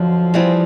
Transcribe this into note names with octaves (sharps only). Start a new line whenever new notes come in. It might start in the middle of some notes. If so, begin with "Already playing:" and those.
Already playing: F2 D3 F3 F#3
E3 G3 C4 F4 G#4